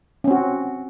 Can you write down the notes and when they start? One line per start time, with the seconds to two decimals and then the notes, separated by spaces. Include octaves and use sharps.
0.24 C#4
0.27 C4
0.31 F#4